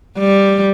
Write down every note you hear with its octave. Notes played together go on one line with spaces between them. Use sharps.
G3